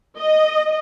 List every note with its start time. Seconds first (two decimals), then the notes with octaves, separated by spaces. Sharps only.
0.19 D#5